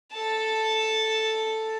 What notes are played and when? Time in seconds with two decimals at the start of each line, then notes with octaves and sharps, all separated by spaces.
0.14 A4 A5